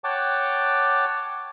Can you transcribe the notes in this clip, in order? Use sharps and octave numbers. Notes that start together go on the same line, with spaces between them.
C#5 F#5 G5 A5 D6